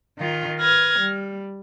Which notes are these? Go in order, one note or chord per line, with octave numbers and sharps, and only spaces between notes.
D#3 F4
B4 F6 G#6 A#6
G3